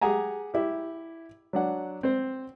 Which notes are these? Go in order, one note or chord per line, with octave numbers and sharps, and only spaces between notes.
G4 G#4 F#5 G#5 A#5
E4 G4
F#3 D4 F#5
C4 C5